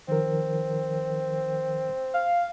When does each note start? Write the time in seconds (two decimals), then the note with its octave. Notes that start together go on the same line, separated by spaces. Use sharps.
0.08 D#3 F3 C4 A#4
2.14 F5